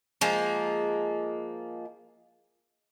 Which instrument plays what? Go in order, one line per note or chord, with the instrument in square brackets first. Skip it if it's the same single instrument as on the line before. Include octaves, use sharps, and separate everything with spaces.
[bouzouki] F3 G#3 A#3